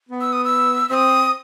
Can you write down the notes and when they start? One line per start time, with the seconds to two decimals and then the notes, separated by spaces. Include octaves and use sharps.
0.09 B3
0.21 E6
0.33 D#6
0.45 E6
0.89 C4 E6
0.93 D#6